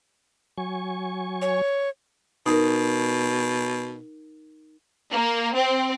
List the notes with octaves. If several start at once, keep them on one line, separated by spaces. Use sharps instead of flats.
F#3 G#5 C#6
C#5
B2 D#4 A#4
A#3
C4